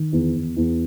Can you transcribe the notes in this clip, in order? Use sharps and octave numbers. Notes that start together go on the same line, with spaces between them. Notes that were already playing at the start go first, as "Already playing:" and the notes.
Already playing: D#3
E2
E2
E2